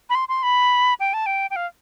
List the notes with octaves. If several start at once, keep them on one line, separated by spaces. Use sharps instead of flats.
B5
C6
C6
B5
G5
A5
G5
G5
F5